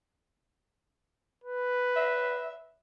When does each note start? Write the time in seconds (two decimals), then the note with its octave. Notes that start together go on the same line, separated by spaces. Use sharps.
1.44 B4
1.96 E5